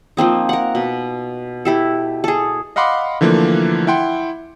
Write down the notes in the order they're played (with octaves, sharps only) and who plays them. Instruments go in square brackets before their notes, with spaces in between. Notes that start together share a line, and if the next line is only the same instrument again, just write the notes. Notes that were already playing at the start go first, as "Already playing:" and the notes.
[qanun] F3 A#3 C4 D#4
A#4 F#5
B2
E4 G4 A4
G#4 A4
[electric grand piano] D#5 F5 F#5 B5 C6 D6
D3 E3 F3 A3 A#3
E4 F#5 G5 C6